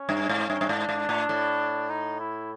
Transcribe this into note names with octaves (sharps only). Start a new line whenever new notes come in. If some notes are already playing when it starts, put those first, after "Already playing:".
Already playing: C#4
G2
G#2
G2
G2
G#2 D4
G#2
A2
A2
D#4
E4